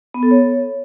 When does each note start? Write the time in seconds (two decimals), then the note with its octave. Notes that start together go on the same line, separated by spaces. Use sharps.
0.14 B3
0.23 A4
0.31 C#5